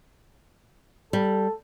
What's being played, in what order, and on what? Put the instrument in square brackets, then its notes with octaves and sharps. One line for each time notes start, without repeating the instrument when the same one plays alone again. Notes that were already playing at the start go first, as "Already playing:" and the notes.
[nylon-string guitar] G3 [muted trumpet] A4